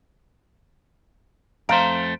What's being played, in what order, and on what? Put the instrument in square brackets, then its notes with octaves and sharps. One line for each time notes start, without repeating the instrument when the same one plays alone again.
[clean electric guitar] F2 A3 C5 [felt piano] F5 A#5 D7